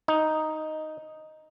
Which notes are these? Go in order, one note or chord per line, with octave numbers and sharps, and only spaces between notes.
D#4